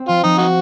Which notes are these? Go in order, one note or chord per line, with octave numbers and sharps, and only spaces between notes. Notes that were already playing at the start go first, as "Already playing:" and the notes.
Already playing: C4
F3 F4
F3 D#4
D#4 F#4